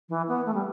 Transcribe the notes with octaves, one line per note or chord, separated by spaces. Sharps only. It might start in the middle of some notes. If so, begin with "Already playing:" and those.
E3
B3
A3
G3